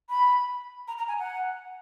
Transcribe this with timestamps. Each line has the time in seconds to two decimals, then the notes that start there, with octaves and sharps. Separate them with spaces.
0.09 B5
0.88 A#5
0.98 A#5
1.08 G#5
1.19 F#5